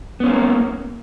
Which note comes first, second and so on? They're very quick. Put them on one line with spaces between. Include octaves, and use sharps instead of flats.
B3 C#4 A#3